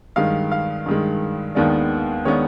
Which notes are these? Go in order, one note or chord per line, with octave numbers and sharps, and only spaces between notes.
G2 D#3 G#3 F5
F5
G2 D#3 G#3
D#2 D#3 G#3 B3 D4
D#3 G#3 B3 D4 C#5